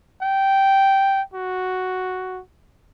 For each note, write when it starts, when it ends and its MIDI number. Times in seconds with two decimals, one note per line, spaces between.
0.22 1.22 79
1.34 2.41 66